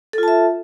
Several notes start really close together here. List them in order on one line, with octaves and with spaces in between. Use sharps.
A4 F4 A5 E5